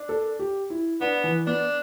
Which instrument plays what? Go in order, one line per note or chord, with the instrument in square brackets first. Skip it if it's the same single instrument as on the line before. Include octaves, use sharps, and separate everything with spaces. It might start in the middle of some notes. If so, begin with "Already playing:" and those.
Already playing: [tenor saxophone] D4
[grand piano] A4
G4
E4
[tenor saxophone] B3 [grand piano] D4
[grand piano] E3
[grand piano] B3 [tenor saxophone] D4